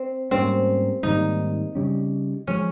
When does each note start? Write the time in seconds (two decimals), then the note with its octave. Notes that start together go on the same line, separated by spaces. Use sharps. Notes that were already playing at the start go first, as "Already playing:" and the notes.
Already playing: C4
0.31 G#2 G3 A#3 C4 C#4
1.03 G#2 D#3 G3 A#3 D#4
1.75 C#3 G3 C#4
2.47 F3 G#3 C#4